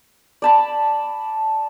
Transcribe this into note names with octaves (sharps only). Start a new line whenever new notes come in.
D5 A5 B5